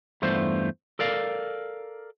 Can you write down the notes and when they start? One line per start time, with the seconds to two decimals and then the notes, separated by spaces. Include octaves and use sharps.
0.22 E2 G2 A3 F4 C5
0.99 A4 A#4 D5 F5